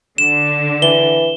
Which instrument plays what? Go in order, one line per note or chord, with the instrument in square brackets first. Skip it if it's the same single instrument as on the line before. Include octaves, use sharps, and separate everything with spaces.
[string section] D3 [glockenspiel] E7
[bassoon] E3 [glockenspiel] G7